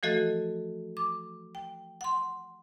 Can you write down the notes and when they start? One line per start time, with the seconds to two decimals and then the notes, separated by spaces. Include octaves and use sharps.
0.03 E3 F3 A3 F#4 A4 D#5
0.97 D6
1.55 G5
2.01 F#5 C6